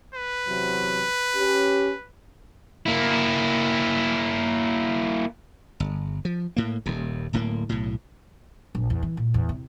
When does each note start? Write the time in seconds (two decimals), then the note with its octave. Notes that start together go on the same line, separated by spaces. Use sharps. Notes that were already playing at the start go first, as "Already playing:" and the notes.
0.14 B4
0.46 E2 C3 F#3
1.35 C#4 G4
2.86 A#3 E4
5.80 G1
6.25 F3
6.56 A2 A#3
6.86 D#1 D#2
7.33 D1 A2 A3 A#3
7.69 B1 A2
8.75 A#1
8.90 E2
9.03 E3
9.17 A#2
9.34 E2
9.49 C3